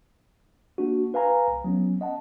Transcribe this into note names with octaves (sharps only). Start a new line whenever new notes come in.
A#3 D4 F#4
B4 F5 G#5 A#5
C2
F#3 B3 C#4
D#5 F#5 A5